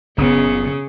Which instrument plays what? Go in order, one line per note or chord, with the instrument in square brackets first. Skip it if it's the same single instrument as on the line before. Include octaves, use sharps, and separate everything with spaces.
[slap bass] F#1 A#2 B3 [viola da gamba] C#3